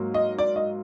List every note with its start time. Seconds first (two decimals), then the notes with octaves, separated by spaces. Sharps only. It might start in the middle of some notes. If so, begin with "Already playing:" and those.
Already playing: G#2 F#3 A#3
0.14 D#5
0.39 D5
0.56 D#5